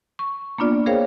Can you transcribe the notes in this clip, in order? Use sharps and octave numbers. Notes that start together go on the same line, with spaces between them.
C#6
A#3 B3 D4 F4 D5
G#4 A#4 C5 C#5 F5 G5